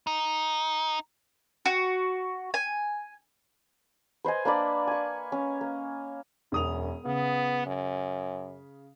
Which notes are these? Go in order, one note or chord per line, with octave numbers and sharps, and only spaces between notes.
D#4
F#4
G#5
B4 C5 D#5 G#5
A#3 D4 B4 D5
G#5 C#6
C#4
A#3
E1 F#2 D#6 F7
C#3 B3
F#2